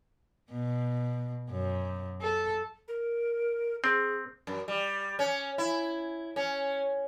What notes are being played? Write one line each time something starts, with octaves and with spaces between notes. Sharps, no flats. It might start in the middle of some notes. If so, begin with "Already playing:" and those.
B2
F#2
A4
A#4
C4 G#4
F#2
G3
C#4
E4
C#4